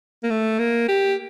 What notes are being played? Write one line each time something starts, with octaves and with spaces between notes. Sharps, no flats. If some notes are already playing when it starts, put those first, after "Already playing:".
A#3
A3
A#3
G4